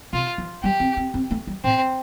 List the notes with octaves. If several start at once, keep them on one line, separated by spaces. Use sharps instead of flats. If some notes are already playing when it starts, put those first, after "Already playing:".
C3 F4
F3
G3 G4
C4
C4
C4
A3
G3
A2 C4